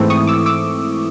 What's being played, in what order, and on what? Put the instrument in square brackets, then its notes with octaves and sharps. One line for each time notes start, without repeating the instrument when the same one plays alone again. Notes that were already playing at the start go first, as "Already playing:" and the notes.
Already playing: [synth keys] G#2 E3 A3 C4 E4
C#6 D#6
D6 E6
D6 E6